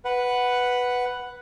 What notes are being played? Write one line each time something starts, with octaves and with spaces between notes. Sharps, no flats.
B4 F#5